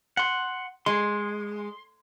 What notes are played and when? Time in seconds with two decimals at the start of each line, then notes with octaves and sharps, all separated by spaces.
0.17 F#5 C6
0.86 G#3 C6